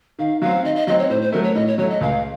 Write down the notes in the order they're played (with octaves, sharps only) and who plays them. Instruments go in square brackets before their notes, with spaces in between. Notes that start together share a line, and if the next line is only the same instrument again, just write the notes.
[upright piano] D#3 [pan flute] F5
[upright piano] F#3 C4 [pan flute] F5
[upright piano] D#3 [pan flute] D#5
[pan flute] D#5
[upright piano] F#3 C4 [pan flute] D#5
[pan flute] C#5
[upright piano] A2 [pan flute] C5
[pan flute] C5
[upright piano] F#3 A3 [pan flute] A#4
[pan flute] C#5
[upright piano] A2 [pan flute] D#5
[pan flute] C#5
[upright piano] F#3 A3 [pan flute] C#5
[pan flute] D#5
[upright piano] C#2 [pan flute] F5